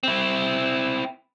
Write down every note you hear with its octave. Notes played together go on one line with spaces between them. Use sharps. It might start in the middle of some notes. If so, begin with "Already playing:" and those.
C4 E4